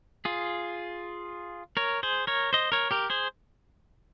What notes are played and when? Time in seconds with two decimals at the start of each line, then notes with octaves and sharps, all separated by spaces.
0.25 F4 G#4
1.77 A#4 C#5
2.03 G#4 C5
2.27 A#4 C#5
2.53 C5 D#5
2.72 A#4 C#5
2.91 G4 A#4
3.10 G#4 C5